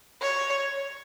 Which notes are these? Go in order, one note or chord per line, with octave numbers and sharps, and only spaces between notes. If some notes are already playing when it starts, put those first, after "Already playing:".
C#5